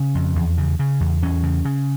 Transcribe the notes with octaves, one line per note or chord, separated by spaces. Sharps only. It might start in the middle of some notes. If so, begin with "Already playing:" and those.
Already playing: C#3 C#4
F2
E2
C#3
C#3
E2
E2 C#4
C#3
C#3